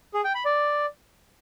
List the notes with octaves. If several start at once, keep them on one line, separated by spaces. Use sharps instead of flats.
G#4
G5
B5
D5